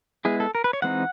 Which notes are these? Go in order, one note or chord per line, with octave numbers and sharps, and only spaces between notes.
G#3 B3 E4 G#4
A4
A#4
B4
C#5
E3 G#3 C4 D#4 F#5